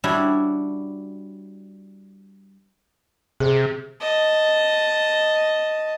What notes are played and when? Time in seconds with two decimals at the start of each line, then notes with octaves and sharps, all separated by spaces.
0.04 G3 D4 E4 F#4 C#5
3.40 C3 G#4
4.01 D#5 A5